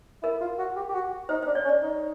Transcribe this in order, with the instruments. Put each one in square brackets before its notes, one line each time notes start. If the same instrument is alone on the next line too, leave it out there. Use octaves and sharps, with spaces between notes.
[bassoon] E4 [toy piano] A#4
[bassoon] F4
F#4
G4
G4
F#4
[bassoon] D#4 [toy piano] C5
[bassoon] D4 [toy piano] C5
[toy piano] C#5
[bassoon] C#4
[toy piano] D5
[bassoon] D#4